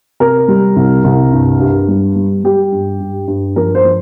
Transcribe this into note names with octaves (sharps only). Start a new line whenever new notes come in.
C3 A#4
G3
C2
C2
G2
G2
G3
G3
G3 G4
G2
G2
G2
F3 A#4
C5
F3